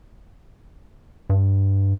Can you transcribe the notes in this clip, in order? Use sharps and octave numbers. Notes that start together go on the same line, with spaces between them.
G2